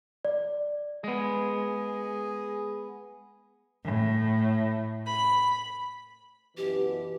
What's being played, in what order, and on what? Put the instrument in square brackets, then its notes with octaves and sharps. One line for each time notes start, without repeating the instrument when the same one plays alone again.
[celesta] D5
[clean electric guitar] G#3 B3 [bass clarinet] G#4
[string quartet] A2
B5
[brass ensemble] F#2 B2 E3 [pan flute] G4